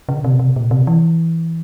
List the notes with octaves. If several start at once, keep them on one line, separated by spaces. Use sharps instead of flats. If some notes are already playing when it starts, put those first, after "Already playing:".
C#3
C3
C3
A#2
C3
E3